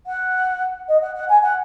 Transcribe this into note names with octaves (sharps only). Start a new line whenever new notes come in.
F#5
D#5
F#5
F#5
G#5
F#5